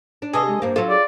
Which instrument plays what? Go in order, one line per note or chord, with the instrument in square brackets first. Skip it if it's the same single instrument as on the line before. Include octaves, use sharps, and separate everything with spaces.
[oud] D4
[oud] C3 [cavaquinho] G#4 A4 D#5 [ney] B4
[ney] G#3
[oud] G2 A#3 [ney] C5
[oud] F#3 A4 [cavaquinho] F4
[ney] G#4 [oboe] D5